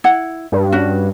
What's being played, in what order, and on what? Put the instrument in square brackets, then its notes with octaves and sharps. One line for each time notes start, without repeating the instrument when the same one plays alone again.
[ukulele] E4 F#5
[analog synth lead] G2
[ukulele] C#4 F#4